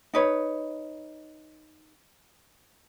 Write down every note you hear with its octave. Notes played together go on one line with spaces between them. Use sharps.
D#4 B4 C#5